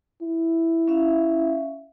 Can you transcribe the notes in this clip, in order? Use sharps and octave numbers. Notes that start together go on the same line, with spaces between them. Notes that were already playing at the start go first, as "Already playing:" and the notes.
E4
C#4 E5 F5